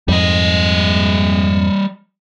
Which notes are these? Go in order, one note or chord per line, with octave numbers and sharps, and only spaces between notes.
F2 G#2 G3 D#5